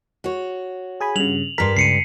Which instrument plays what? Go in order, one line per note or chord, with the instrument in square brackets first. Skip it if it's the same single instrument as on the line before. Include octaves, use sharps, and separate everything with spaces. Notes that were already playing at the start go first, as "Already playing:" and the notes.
[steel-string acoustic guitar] F#4 C#5
[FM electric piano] G#4 G#5 B5
[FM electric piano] G2 C#3 [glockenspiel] F7 F#7
[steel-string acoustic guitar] G2 A4 [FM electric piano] A#4 C6 [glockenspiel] B6
[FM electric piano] C#2 [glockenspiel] C7 C#7 D#7